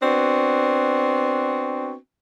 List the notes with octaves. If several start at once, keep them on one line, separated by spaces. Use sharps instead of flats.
B3 C4 D4 F#4